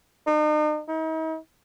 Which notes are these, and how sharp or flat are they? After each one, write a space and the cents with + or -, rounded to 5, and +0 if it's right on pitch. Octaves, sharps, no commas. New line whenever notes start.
D#4 -45
D#4 +45